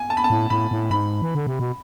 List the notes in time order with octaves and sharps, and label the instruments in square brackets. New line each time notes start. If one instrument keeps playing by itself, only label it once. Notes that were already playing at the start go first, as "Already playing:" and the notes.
Already playing: [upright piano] G#5
A5
B5
A5
[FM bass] A2
[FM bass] A2 [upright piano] B5
[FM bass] A2
[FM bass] G#2 [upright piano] B5
[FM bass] E3
D3
C3
B2